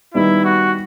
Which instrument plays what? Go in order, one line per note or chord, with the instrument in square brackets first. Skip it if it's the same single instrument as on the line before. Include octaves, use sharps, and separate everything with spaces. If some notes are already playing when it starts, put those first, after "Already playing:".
[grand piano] D#3 G3 B3 D#4 [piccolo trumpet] E4
[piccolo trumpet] F#4